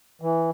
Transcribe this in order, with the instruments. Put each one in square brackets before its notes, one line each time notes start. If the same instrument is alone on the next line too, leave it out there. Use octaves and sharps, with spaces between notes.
[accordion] E3